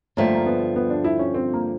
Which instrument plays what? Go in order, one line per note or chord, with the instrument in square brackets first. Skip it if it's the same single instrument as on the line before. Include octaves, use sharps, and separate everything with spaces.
[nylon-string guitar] G2 D3 F3 A3 [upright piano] A#3
[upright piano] A#3
B3
B3
D4
E4
C#4
C4
A#3